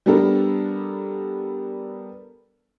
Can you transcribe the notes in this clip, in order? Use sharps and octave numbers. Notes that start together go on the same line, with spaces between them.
G3 B3 D4 A4 A#4